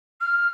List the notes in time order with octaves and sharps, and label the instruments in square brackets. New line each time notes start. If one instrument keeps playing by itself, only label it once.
[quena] F6